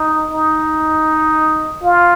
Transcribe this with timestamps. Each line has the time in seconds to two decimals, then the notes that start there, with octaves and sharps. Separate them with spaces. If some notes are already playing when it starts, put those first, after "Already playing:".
Already playing: D#4
0.31 D#4
1.83 F4